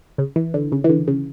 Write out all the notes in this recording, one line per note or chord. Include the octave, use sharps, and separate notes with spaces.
C#3
E3
D3
C#3
E3
D3
C#3